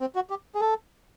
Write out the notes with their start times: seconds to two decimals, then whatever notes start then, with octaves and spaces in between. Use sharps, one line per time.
0.01 C4
0.15 F#4
0.30 G4
0.55 G#4
0.61 A4